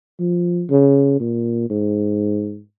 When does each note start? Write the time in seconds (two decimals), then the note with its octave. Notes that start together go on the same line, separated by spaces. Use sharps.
0.19 F3
0.70 C#3
1.20 A#2
1.70 G#2